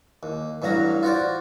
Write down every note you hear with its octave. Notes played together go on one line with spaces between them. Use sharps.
D#2
A1 G2 F#3 F5 A#5
F4 F#4 C5 D5